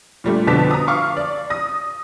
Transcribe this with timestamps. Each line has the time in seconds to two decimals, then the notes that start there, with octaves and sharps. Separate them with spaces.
0.24 A#2 G3 A3 D4
0.47 F2 B2 D3 A5 D6 B6
0.71 A#5 D#6
0.87 F5 C#6 D6 F6
1.17 D5
1.50 D#6 A#6